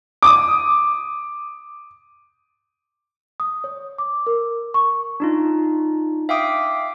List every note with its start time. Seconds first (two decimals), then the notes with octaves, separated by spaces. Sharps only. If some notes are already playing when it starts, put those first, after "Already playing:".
0.23 D6 D#6
3.40 D#6
3.64 C#5
3.98 D6
4.27 A#4
4.74 C#6
5.20 D4 D#4 F4
6.29 E5 F5 G5 D6 D#6